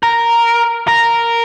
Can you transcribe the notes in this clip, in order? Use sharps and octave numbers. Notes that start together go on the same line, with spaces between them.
A#4
A#4